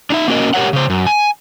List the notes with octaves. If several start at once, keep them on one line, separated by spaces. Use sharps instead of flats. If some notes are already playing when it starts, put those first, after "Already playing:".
D4 D#4 E5
A#3 C#4 F#4 A#4 D#5
G4 A#4 C#5 F#5
C#3 C5
F#2
G#5